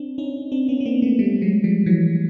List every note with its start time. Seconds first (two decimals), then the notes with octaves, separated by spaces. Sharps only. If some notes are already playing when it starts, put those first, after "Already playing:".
Already playing: C4 D4
0.18 C#4 D#4
0.52 C4 D4
0.69 B3 C#4
0.81 B3
0.86 A#3 C4
1.02 A3 B3
1.19 G3 A3
1.42 F#3 G#3
1.64 F3 G3
1.86 E3 F#3